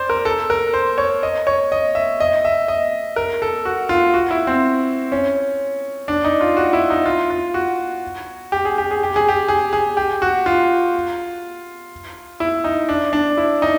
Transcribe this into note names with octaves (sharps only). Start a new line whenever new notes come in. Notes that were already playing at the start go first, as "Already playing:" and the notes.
Already playing: C5 D5
A#4
A4
A#4
C5
C#5
D#5
C#5
D#5
E5
D#5
E5
D#5
A#4
A4
F#4
F4
F#4
E4
C4
C#4
D4
D#4
F4
F#4
E4
D#4
F4
F4
F#4
G4
G#4
G4
G#4
G4
G#4
G4
G#4
G#4
G4
F#4
F4
E4
D#4
D4
D4
E4
D#4